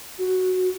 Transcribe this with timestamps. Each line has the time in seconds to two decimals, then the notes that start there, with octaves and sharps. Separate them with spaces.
0.18 F#4